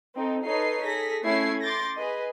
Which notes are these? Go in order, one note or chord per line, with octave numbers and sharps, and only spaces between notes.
C4 D#4 A4
D#4 A4 B4 C#5 D#5 C7
G#4 A4 A#6 B6
A3 C#4 E4 G#6 C7
C6 D6 G6 A6 A#6
G#4 B4 D#5